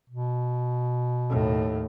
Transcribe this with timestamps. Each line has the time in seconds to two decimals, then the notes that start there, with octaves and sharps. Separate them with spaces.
0.10 B2
1.29 D#2 A2